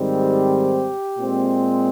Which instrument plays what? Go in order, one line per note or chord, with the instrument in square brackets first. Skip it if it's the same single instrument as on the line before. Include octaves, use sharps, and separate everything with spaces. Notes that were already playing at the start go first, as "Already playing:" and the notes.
Already playing: [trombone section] G#2 D#3 G3 C4
G4
A#2 G#3 C4